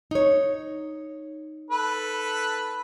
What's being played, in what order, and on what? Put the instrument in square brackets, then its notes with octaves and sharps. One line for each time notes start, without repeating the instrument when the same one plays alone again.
[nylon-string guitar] D#4 C#5
[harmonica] A4 B4